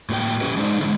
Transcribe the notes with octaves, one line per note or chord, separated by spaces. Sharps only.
A2 A#3 F#4 B4 G5
A3 C#4 F#4 G4 B4
G#3 D4 D#4 C5
D3 E3 G#3